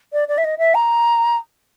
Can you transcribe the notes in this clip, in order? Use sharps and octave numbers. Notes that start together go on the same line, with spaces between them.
D5
D5
E5
D#5
E5
A#5